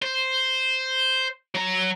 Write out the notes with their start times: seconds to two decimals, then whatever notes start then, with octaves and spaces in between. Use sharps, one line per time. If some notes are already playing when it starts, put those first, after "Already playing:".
0.02 C5
1.55 F#3 A#5